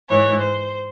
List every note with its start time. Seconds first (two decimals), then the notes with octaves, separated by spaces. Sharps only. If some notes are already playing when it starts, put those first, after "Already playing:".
0.09 G#2 E3 C#5
0.41 C5